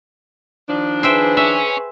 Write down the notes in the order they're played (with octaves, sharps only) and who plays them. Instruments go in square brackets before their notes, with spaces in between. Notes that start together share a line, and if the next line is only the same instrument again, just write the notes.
[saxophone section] D#3 F3 D4
[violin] G#4 B4 [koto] C5 E5 G5
[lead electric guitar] C#4 [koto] E5